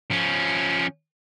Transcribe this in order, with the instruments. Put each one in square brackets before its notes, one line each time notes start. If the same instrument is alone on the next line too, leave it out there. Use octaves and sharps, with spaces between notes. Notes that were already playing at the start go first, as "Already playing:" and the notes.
[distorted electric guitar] F3 C#4